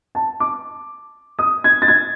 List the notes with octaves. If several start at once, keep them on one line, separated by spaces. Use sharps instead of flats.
A5
D6
D#6
G#6
A6
G#6